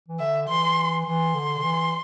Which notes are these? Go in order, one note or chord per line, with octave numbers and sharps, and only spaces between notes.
E3
D3 E5
E3 C6
E3 C6
D3
D3
E3